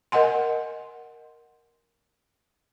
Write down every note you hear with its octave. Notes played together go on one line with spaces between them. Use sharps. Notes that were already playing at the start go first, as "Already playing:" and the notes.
A#4 D#5 F#5 G#5 C6